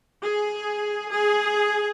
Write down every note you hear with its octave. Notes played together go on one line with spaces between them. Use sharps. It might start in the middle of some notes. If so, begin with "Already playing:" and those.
G#4
G#4